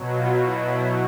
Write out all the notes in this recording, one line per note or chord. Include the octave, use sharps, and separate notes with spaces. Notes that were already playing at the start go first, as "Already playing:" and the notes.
Already playing: B2 F#3
F4
E4
E4